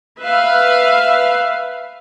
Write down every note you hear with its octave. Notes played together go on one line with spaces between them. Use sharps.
B4 E5 F5